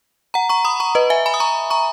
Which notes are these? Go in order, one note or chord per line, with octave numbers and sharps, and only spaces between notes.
F#5 A#5
A#5 C#6
B5 D#6
A#5 C#6
B4 D#5
E5 G#5
G#5 B5
D#6
A#5 C#6
A#5 C#6